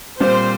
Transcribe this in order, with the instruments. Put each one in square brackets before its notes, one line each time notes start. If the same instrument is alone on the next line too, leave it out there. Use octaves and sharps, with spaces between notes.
[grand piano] A#2 G3 C4 [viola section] C5